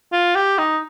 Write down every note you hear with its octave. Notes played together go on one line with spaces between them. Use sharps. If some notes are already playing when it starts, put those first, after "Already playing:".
F4
G4
D#4